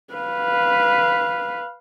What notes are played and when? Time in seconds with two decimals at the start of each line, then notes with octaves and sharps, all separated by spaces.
0.14 B4 F5